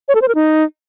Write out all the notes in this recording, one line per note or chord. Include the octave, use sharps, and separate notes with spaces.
C#5
A4
C5
A#4
D#4